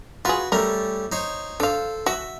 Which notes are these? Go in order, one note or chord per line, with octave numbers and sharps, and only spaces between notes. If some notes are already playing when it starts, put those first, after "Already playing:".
F4 F#4 G#4 B4
G3 A3 C#4 A#4
D#4 C5 C#5
D4 A4 C5 F5
F#4 E5